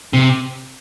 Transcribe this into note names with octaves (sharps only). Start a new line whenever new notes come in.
C3